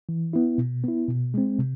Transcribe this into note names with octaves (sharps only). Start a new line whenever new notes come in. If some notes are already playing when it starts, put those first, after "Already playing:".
E3
B3 E4
B2
B3 E4
B2
G#3 C4
C3